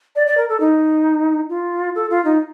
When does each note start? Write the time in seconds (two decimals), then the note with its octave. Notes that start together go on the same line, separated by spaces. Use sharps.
0.16 D5
0.27 D5
0.37 A#4
0.49 A4
0.60 D#4
1.49 F4
1.95 A4
2.10 F4
2.25 D#4